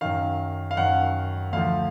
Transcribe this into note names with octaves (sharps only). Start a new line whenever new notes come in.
F#2 D#3 F5
F5
F#2 D#3 F#5
D2 D3 F3 F5